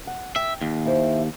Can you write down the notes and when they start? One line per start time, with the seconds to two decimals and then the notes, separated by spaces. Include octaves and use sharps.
0.07 F#5
0.36 E5 G5
0.61 D#2
0.86 E4 C5